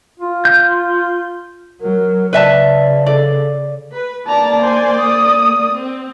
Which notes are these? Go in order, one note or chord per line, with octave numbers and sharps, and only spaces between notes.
F4
G6
F#3 A#4
C#3 B4 D5 E5 A5
A4 D5
B4
A#3 D5 A5 A#5
C5 G#5
D#6
C4